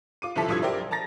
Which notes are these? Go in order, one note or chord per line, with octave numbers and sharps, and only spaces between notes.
F4 D6 D#7
G1 C3 F3 E4 A4 B6
B1 G2 F3 D#6 E6 G#6
G4 A#4 C5 D5 E5
A5 A#5 A6 A#6